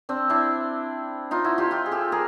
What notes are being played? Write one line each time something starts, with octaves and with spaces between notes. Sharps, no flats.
C4 D4
D4 E4
D#4 F4
E4 F#4
F4 G4
F4 G4
G#4
G4 A4
G#4 A#4